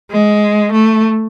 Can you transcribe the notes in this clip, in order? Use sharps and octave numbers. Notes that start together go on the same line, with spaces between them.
G#3
A3